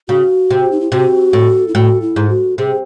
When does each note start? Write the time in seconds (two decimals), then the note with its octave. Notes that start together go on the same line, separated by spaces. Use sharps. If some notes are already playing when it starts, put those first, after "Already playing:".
0.08 C#3 F#4
0.51 C3
0.72 D#4
0.81 E4
0.92 C3 F#4
1.33 A2
1.68 E4
1.75 A2 F#4
2.02 E4
2.16 G#2
2.29 F#4
2.58 C3 G#4